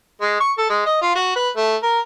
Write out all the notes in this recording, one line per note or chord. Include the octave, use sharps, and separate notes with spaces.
G#3
C#6
A4
G#3
D#5
F4
F#4
B4
A3
A#4